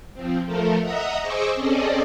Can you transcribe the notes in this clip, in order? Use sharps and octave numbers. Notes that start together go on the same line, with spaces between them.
F3 C4
F3 A3 A4 A#4
D#5 E5 F#5 A#5 D#6
G#4 C5 D#5 C#6 D6 E6
C4 C#4 G#4 A4 D5 D#5